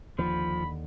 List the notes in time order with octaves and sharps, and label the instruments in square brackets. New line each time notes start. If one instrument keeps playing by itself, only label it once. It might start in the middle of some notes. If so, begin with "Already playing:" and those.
[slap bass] D#2 D3 [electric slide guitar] F3 [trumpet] B5